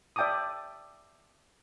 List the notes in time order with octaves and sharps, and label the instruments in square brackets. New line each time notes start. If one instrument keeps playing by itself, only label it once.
[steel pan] D5 E5 G5 A5 D6 D#6